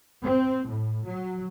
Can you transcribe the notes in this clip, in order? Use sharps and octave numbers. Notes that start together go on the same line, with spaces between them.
C4
A2
F#3